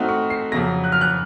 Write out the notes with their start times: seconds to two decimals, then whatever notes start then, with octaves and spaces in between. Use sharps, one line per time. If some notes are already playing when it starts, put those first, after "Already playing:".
Already playing: A3 C4 D#4 F#4 F6
0.09 C#6
0.30 C7
0.52 F2 C#3 F#3 A#6
0.84 F#6
0.92 F6
1.01 F#6